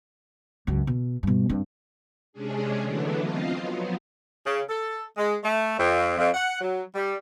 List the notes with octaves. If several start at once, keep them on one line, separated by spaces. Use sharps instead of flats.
C#2 F#2
B2
G2 B2
G2 C4
C3 G#3 C#4 D4 G#4
D3 E3 F#3 A3 B3 D4
C4 F4 D#5 F5
F3 F#3 B3
C#3
A4
G#3
A3
F2
F2
F#5
F#3
G3